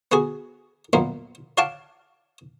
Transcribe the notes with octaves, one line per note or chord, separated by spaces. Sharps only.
B3 F#4 G#4
F#2 A#2 A#3 B3 F4
C#5 F5 F#5 A5 D6